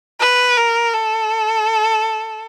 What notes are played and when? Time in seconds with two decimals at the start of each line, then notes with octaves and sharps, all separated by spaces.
0.20 B4
0.57 A#4
0.93 A4